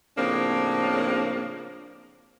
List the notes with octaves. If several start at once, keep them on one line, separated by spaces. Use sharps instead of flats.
A2 C#3 F3 A#3 C4 D4